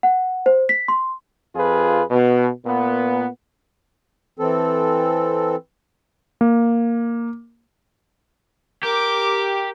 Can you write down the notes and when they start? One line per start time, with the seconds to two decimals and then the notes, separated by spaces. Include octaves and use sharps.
0.03 F#5
0.46 C5
0.69 B6
0.88 C6
1.55 F2 F4 G#4 B4
2.11 B2
2.65 A#2 B3
4.39 E3 C4 A4
6.41 A#3
8.83 G4 A#4 D6